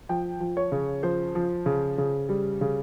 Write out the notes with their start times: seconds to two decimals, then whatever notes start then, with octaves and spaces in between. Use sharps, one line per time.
0.09 F3 G5
0.40 F3
0.57 C#5
0.72 C#3
1.03 F3 C5
1.35 F3
1.66 C#3
1.98 C#3
2.29 G3
2.61 C#3